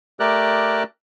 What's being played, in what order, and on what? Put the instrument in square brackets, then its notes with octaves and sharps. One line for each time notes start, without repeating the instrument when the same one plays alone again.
[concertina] A3 G4 A#4 D5 F#6